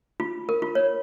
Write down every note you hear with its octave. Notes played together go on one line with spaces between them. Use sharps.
F4
A#4
F4
C#5